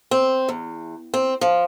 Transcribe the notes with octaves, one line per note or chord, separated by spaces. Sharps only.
C4
E2
C4
F3